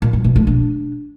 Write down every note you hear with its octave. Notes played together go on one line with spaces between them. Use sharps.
A#2
G3
B2
A3
D4